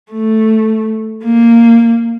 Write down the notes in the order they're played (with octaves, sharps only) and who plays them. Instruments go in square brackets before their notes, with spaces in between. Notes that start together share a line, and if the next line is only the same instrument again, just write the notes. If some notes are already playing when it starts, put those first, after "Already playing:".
[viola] A3
A#3